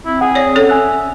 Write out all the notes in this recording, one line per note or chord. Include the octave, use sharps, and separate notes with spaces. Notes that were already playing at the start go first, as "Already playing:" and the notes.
C4 E4
G#4 F#5
C#5 D5
C#4 A4 C#5
E5 G#5 F#6